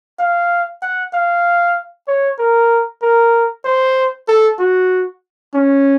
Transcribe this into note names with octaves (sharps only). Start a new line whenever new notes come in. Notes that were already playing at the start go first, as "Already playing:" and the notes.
F5
F#5
F5
C#5
A#4
A#4
C5
A4
F#4
C#4